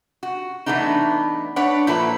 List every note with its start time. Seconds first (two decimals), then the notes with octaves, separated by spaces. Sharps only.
0.23 F#4
0.66 E3 F3 A3 B3 D4 D#4
1.56 D4 B4 C#5 D5 F#5
1.87 A#2 F3 E4 A4 B4